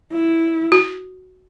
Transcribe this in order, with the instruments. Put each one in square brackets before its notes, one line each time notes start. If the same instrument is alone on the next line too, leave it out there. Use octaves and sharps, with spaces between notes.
[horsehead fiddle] E4
[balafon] F#4